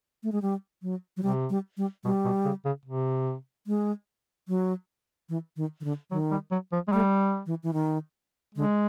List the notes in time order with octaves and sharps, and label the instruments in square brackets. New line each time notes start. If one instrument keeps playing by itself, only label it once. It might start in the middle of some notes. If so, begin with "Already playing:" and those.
[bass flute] A3
G#3
G3
F#3
F#3
[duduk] C3 [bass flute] G3
[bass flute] G3
G3
[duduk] B2 [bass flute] G3
[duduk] B2
C#3
C#3
C3
[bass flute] G#3
F#3
E3
D#3
D#3
D3
[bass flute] D#3 [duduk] F#3
[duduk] G3
F#3
F3
G#3
[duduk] G3 [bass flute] A3
[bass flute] E3
E3
D#3
[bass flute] D3 [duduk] G#3